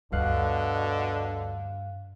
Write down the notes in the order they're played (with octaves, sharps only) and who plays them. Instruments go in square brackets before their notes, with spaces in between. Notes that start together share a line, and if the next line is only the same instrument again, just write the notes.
[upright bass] D2 [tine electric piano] G2 F5 F#6 [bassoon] B2 [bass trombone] D3